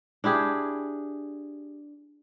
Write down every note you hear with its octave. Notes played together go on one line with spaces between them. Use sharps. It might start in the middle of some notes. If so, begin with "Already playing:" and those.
D4 E4 G4 G#4